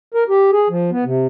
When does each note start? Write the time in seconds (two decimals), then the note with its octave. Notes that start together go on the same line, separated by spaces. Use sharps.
0.14 A#4
0.29 G4
0.52 G#4
0.70 F3
0.91 B3
1.05 C3